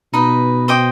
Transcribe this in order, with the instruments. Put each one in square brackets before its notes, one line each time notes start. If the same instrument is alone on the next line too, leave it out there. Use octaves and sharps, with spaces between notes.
[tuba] B2 [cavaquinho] D#4 B4 D#5
[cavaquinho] C5 D#5 G5 D6